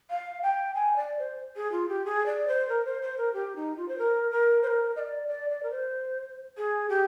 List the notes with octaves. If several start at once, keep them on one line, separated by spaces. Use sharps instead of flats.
F5
G5
G#5
D5
C5
G#4
F4
G4
G#4
D5
C5
A#4
C5
C5
A#4
G4
D#4
F4
C5
A#4
A#4
C5
A#4
D#5
D5
D5
D5
A#4
C5
G#4
G4